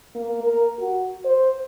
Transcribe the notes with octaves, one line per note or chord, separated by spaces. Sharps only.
A#3
A#4
F#4
C5